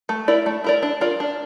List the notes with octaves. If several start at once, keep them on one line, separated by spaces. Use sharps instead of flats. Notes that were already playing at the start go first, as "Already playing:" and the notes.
A3
E4 A#4 D5
A3
E4 A#4 D5
D4
F4 A#4 D5
D4